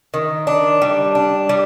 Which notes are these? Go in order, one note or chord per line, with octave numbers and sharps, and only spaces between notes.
D#3
D4
G3
D4
G3